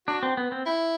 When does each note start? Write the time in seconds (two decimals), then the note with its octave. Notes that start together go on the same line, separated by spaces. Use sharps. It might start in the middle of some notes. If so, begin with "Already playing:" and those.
0.07 D4 F#4
0.23 C4
0.37 B3
0.52 C4
0.66 E4